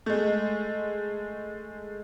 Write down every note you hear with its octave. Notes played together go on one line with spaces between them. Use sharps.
G#3 A3